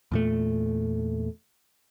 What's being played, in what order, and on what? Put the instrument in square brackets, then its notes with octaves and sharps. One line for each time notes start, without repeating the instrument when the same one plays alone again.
[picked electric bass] E2 A#2 A3